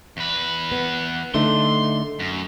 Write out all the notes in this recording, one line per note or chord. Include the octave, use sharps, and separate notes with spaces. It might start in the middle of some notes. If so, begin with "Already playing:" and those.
E2 B4
B3
D3 A3 D#4 C6
F#2